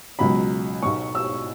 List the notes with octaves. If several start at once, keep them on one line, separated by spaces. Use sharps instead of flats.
C#2 B2 F#3 B5
B1 B2 F#3 C#6
E6